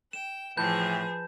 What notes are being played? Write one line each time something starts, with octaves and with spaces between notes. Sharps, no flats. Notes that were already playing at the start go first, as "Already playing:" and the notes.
G5 E7
A2 E3 F3 G#4 B4 A5 B5 G6